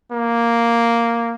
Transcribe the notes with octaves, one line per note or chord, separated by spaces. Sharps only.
A#3